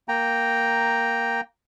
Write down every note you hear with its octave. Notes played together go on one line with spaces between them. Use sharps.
A#3 G5 A#5